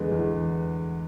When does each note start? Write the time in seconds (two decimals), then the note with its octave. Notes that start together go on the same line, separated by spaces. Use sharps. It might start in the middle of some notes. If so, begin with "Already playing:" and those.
Already playing: E2 D3 G#3 B3
0.11 E2